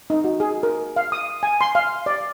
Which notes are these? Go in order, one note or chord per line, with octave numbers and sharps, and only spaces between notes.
D#4
F#4
G#4
A#4
F5
D#6
G#5
C6
F5
D5